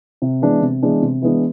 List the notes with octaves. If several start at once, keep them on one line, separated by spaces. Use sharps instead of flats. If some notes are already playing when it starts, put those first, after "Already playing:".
C3
E3 G#3 B3 D4
C3
E3 G#3 B3 D4
C3
E3 G#3 B3 D4